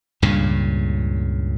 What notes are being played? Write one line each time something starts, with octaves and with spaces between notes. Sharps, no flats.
C#2 G2 A#2 C#3